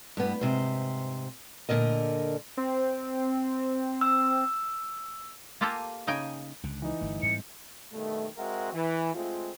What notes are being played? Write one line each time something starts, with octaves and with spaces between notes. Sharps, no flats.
G2 B3
G#2 C3 C5
A#2 D3 A#4 D#5
C4
E6
A#3 F4 G4 A4 G#5 A#5
C#3 D#4 D#5 G5 G#5
C#2 D3
E3 D#4
G1 A3
G#2 G3 C4 C#7
G2 B2 D#3 A3
G#3 C4 F#4 A#4 E5 F#5
E3
G#3 A3 C4 F4